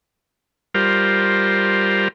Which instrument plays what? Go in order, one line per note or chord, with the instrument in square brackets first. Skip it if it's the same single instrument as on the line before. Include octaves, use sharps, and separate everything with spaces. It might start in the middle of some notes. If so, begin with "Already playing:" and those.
[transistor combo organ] G3 F4 A#4 C5